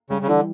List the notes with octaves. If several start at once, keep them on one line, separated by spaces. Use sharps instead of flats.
C#3 G3
C#3
D3 E3